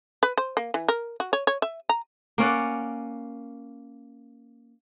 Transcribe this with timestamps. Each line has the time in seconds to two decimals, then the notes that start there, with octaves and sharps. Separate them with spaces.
0.23 B4
0.38 C5
0.57 A#3
0.74 E3
0.89 A#4
1.20 F#4
1.33 C#5
1.47 C#5
1.62 E5
1.89 A#5
2.38 A#3 C#4 D5 F#5